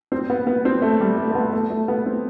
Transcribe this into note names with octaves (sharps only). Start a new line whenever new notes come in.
C4
B3
B3
C4
A3
G3
A3
A3
B3
A3
A3
B3
C4